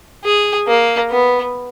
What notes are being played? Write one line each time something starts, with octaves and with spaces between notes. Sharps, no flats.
G#4
A#3
B3